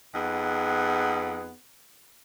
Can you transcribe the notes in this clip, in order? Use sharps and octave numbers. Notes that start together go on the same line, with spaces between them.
F2 B3 D#4 G#4 F#5